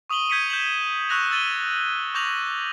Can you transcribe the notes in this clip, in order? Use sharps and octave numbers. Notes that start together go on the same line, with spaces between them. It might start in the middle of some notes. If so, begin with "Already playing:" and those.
C#6 D#6 D#7 F#7 G7
G6 G#6 B6 C#7 D#7
G6 E7 F#7
C#6 E6 F#6 A#6 F7
E6 A6 D#7 G7
C#6 D6 G6 A#6 F7 F#7